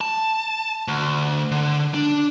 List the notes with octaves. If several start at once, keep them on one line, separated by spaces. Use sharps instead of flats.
A5
D2
D3
D4